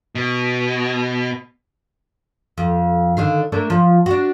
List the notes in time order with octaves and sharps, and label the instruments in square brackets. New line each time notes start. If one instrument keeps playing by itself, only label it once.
[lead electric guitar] B2
[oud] F2
D3 D#3 F5
A3 A#3 D4
F3
D4 F#4